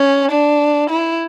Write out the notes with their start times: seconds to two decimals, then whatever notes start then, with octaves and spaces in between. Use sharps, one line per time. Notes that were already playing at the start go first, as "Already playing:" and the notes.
Already playing: C#4
0.31 D4
0.90 E4